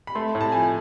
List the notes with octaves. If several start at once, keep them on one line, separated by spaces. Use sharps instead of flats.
B5
A3 C6
A2
A5
F3 G#5